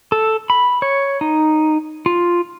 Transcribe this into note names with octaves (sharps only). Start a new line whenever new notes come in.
A4
B5
C#5
D#4
F4